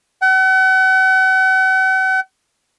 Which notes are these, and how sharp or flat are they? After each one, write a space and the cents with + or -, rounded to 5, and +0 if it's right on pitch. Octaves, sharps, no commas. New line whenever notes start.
F#5 +40